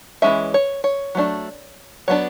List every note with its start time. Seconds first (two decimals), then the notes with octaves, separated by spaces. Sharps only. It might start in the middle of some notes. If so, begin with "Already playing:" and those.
0.22 E3 G#3 C#4 E5
0.54 C#5
0.84 C#5
1.15 F#3 A3 D4
2.08 F#3 B3 D4 C#5